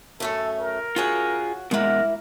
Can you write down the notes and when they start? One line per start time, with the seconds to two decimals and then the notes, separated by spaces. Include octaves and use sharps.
0.20 F#2 A3 C#4 A4
0.60 A#4
0.96 F4 F#4 G#4 C#5 F#5
1.71 B2 G#3 A#3 E4 A#4 F#5